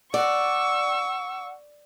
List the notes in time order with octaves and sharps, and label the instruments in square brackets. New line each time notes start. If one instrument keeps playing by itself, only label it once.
[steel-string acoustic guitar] D5 [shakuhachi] F#5 [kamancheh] C#6 E6